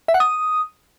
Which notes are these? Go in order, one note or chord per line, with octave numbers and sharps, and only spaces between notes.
E5
F#5
D#6